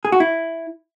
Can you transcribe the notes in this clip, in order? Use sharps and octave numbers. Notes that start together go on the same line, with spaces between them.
G#4
F#4
E4